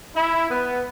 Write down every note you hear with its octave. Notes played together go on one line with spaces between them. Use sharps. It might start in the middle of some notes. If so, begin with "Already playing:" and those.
E4
B3